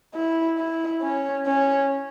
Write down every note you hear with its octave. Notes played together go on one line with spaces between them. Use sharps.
E4
E4
C#4
C#4